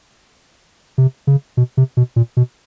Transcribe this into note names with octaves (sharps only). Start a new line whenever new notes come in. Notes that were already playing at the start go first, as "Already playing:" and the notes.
C3
C#3
B2
C3
B2
A#2
B2